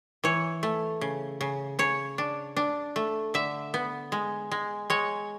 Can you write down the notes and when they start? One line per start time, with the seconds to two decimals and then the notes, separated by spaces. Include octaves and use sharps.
0.24 E3 C#5
0.63 A3
1.01 C#3
1.41 C#3
1.79 C#3 C#5
2.18 D4
2.56 D4
2.96 A3
3.34 D3 E5
3.74 B3
4.12 G#3
4.51 G#3
4.90 G#3 C#5